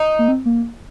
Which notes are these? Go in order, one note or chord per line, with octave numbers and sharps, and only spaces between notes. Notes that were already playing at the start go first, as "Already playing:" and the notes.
Already playing: D#4
A#3
C4
A#3